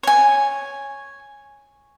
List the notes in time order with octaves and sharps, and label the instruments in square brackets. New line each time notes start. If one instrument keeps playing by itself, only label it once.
[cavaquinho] C#5 G#5